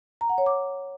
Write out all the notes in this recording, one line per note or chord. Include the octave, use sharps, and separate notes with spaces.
A#5
F#5
C#5
D6